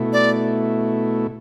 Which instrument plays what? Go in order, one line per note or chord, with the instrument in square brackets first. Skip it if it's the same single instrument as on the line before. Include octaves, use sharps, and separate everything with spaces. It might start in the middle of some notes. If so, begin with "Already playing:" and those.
Already playing: [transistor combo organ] B2 A3 E4
[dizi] D5